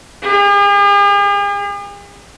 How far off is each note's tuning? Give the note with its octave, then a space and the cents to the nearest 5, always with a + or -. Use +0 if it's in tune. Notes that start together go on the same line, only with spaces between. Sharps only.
G#4 -45